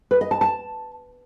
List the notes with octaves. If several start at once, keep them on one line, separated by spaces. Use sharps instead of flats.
B4
D#5
A5
A5